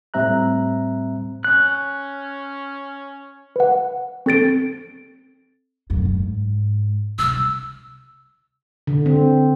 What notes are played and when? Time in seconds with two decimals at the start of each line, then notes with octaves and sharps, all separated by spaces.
0.14 A2 G3 C4 E5 A#5 F#6
1.44 C#4 F#6
3.56 B4 F#5
4.26 C4 A4 A6 D7
5.90 F#2 A2
6.05 G#2
7.19 C2 E6
8.87 D3
9.06 C4